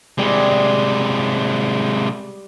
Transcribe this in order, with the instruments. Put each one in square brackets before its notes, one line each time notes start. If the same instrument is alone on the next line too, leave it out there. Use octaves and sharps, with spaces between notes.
[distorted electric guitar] C3 G#3 [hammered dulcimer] G3